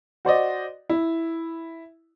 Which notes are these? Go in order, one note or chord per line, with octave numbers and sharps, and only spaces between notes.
F#4 C5 D5 D#5
E4